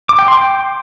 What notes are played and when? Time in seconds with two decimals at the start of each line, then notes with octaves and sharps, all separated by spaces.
0.09 D6
0.19 G5
0.28 C6
0.37 G5